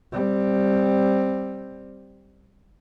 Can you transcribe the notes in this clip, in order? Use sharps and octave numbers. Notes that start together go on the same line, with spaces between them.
G3 C4